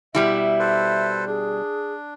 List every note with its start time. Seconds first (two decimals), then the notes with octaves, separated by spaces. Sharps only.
0.15 B2 G3 E4 E5
0.59 A4 B4 C5
1.27 D4 G#4